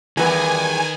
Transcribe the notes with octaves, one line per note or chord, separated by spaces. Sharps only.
E2 D#3 G3 A#4 B4 G#5